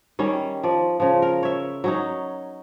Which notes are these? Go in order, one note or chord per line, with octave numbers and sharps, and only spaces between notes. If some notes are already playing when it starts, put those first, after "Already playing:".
D#3 G3 C#4
F3 D5
C#3 F3
A#4
C#5 E5
F#3 C#4 D#4